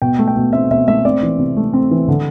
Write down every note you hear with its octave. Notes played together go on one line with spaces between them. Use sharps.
B2 G5
A3
G5
B2
C4 E5
B2 E5
A3 E5
C4 D5
E3
C3
A3
C4
E3
D3